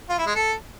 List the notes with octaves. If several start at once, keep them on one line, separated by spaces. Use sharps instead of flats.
F4
E4
G#3
A4